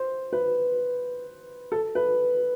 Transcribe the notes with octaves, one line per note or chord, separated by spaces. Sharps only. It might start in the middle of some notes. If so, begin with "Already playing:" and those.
Already playing: C5
B4
A4
B4